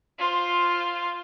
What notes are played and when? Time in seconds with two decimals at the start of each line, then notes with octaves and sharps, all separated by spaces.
0.19 F4 C5